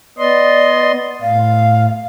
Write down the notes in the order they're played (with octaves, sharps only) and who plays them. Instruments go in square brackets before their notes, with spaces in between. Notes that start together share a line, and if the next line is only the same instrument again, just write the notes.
[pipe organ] B3 D#5 C6 [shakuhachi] D5
[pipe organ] A2 [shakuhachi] F5